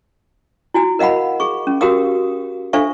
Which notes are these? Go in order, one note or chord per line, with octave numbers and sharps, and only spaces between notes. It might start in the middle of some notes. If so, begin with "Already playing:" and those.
E4 F#4 G#5
A#4 D#5 F5 F#5 B5
G#4 C#6
C#4
F#4 G4 A#4 F5 D#6
D4 A4 C5 E5 F5 C#6